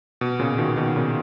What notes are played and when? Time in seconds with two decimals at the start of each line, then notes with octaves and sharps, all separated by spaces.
0.21 B2
0.39 A#2 C#3
0.58 B2 D#3
0.77 B2 D#3
0.96 A#2 C#3